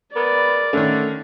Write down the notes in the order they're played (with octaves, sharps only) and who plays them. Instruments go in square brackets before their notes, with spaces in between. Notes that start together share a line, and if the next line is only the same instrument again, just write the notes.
[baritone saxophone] B3 [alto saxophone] A#4 [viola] D5
[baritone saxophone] D3 [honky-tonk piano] D#3 C#4 [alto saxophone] A3